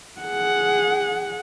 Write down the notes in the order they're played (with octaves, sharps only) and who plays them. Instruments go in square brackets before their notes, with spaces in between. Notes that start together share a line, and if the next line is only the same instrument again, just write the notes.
[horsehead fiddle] G#4 F#5